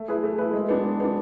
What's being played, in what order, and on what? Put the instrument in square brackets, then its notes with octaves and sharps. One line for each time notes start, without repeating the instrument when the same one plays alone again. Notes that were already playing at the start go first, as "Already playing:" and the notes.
Already playing: [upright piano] A3
E4 G#4 B4
A3
E4 G#4 B4
G#3
B3 D4
G#3
B3 D4